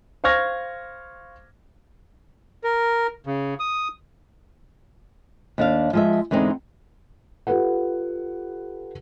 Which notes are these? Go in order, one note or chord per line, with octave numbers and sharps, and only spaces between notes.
C5 F5 C#6 F6 G#6 A#6
A#4
C#3
D#6
D#2 D4 F5
F3 G#3 E5
E2 D3 G#3 C4 D#4
F4 G4 A4 B4 F#5